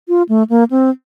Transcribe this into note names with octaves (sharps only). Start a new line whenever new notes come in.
F4
A3
A#3
C4